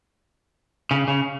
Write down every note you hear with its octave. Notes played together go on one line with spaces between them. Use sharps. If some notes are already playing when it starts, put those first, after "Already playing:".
C#3
C#3